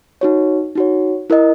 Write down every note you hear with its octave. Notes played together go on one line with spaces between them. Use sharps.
D#4 F#4 C#5
D#4 F#4 C#5
E4 A#4 D#5